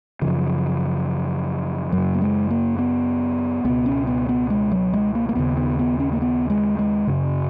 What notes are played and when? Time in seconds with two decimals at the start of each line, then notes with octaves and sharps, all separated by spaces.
0.22 F#2 C#3 F3
1.92 F#2 C#3 F#3
2.14 A#3
2.22 G#3
2.51 A#3
2.79 B3
3.64 C#2 B2 B3
3.86 C#4
4.07 B3
4.29 B3
4.50 G#3
4.71 F#3
4.93 G#3
5.15 A#3
5.29 A#3
5.35 D#2 C#3 B3
5.57 B3
5.79 B3
6.00 C#4
6.12 A#3
6.22 B3
6.50 G#3
6.79 G#3
7.07 F#2 C#3